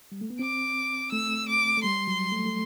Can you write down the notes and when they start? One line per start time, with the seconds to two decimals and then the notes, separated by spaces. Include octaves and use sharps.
0.12 G3
0.21 A3
0.30 B3
0.39 C4 D6
1.12 A3 E6
1.48 D6
1.77 A3
1.84 G3 C6
2.07 F#3
2.32 A3
2.46 A3